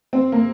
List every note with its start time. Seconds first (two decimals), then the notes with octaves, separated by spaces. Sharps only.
0.13 C4
0.32 A#3